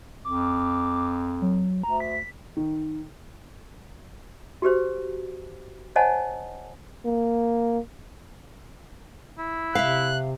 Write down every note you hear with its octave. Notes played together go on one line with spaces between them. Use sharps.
F2 D6
F#3
D2 A#5
B6
D#3
F#4 G4 B4 C5
C5 C#5 D#5 F#5 G#5 A5
A#3
E4
C3 E5 F5 F#6